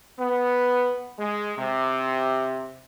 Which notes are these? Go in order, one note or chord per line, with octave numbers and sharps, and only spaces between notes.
B3
G#3
C3